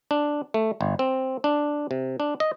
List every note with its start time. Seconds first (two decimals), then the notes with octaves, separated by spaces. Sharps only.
0.11 D4
0.54 A3
0.81 G1
0.99 C4
1.44 D4
1.91 C3
2.20 D4
2.40 D#5